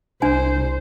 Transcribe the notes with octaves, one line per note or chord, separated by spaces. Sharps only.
C2 D4 C5 G#5